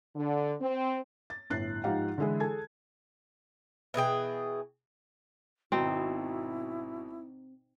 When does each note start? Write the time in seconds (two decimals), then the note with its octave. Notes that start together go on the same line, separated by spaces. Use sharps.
0.16 D3
0.61 C4
1.30 A6
1.50 G1 A2 F#6 A6 C7
1.84 G#2 F3 D#4 G4 F5 F#5
2.18 D3 E3 G#3 E4 G#4
2.40 G#4 A4 G#5 A5 G#6
3.94 B2 E3 G#4 G5
5.72 G#1 B2 C4 D#4 E4